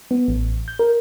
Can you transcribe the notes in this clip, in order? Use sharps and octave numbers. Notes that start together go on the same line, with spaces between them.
B3
A1
G6
A#4